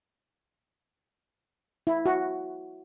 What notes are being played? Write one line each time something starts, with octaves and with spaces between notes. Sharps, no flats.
E4
F#4